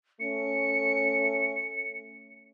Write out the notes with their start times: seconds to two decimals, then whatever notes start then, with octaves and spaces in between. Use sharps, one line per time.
0.20 A3 C#4 C#7